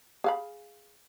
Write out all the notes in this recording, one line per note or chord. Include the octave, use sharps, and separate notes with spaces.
G#4 F5 B5